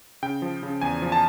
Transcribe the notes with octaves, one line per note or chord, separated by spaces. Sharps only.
C#3 G5
F3
C#3
E2 G#5
F3
A5